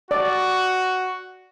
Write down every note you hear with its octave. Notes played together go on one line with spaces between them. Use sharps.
F#4 D5